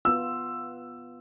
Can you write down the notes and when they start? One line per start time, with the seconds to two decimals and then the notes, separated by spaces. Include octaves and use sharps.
0.05 B3 F4 E6